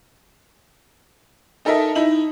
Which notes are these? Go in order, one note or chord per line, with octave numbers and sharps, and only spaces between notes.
D#4 A4 A#4 D#5 E5
D#4 E4 F#7